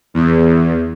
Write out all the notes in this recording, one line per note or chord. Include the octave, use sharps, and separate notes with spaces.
E2